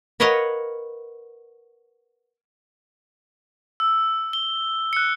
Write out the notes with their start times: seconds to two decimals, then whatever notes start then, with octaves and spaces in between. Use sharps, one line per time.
0.20 A#4 B4 C#5 D#5 F5 F#5
3.80 E6
4.33 G7
4.93 F#6 C#7